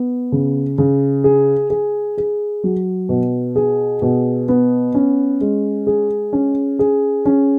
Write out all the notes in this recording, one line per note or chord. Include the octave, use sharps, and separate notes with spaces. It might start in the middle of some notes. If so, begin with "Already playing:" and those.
Already playing: B3
C#3
C#3
G#4
G#4
G#4
F#3
B2
G#4
B2
B3
C#4
G#3
G#4
C#4
G#4
C#4